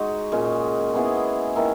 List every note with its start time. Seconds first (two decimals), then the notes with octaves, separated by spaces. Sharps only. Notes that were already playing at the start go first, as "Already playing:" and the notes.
Already playing: G#3 D#4 F#4
0.32 A#2 G#3 C#4
0.94 G#3 B3 E4 G#4
1.56 D#3 A#3 E4 A#4